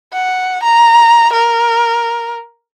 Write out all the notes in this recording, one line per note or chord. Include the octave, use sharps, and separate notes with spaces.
F#5
A#5
A#4